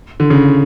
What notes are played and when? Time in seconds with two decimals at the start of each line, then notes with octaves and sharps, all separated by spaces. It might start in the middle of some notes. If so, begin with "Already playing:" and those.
0.20 D3
0.30 C#3